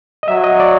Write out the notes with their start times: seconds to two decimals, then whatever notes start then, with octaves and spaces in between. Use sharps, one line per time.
0.23 D#5
0.28 F#3 E5
0.44 D#5
0.60 D5